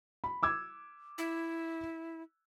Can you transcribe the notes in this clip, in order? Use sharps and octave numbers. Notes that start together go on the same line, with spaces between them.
B5
D6 E6 G#6
E4